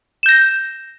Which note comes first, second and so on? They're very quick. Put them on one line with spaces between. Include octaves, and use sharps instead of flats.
E7 G6 A#6